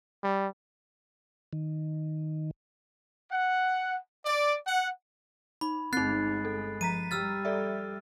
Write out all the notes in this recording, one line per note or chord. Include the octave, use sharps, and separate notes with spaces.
G3
D#3
F#5
D5
F#5
D#4 B5
G1 G#3 C4 D#4 F#6 A6 C7
A4
F3 A#5 B6 D#7
G3 E6 F6 A6
A4 D5 E5